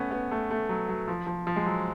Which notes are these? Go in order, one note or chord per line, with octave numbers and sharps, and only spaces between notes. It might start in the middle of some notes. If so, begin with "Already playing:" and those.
Already playing: A3 B3 C#4
B3
A3
A3
F#3
F#3
F3
F3
F3
G#3
F#3